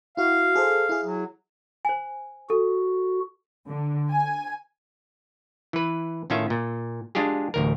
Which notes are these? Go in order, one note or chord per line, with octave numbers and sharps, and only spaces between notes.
E4 F#4 F5
G#4 A4 C5
E4 G#4
F#3
C5 G#5
F#4 A4
D3
G#5
E3 B4
A2 D#3 C#4 F4 E5
A#2
G#3 D4 F4 G4 G#4
A1 D2 A#4